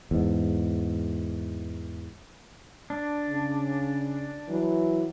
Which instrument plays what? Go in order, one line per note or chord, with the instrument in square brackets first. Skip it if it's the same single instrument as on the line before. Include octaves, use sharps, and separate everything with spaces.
[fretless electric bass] E2 G#2
[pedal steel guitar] D4
[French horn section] C#3
E3 F#3